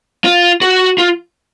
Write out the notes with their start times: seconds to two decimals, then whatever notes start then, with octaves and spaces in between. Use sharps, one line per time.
0.24 F4
0.61 F#4
0.98 F4